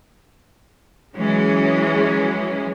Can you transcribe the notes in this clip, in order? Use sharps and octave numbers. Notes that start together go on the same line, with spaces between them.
E3 F#3 G#3 C#4